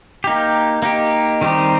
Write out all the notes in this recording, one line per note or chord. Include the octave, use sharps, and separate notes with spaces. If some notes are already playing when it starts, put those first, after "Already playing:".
A#3 D#4 G4
A#3 D#4 G4
D#3 G3 C4 D#4 G4